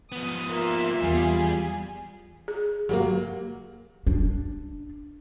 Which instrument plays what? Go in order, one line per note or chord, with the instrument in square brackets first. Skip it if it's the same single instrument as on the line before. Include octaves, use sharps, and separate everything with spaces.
[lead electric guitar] F3 B3 [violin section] D#6
[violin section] A#3 E5 C6 [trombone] F4
[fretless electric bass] E2 [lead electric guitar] G3 [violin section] G#4
[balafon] G#4
[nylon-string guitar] F#3 G3 A#3 [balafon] G4 A#4
[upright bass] D4